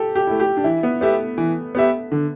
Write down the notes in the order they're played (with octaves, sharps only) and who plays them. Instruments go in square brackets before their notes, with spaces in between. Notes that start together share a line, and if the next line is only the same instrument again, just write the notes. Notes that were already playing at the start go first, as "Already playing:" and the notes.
Already playing: [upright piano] G4 A4
G4
[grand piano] A3 E4
[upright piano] G4
D4
[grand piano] E3 [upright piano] E4
[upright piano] B3
[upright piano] A3 [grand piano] B3 G4 E5
[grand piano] E3
B3 G4 E5
D3